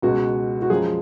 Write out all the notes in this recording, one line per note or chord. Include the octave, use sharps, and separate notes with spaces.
C#2 B2 G#3 F#4
F#4
F#2 F3 G#3 G#4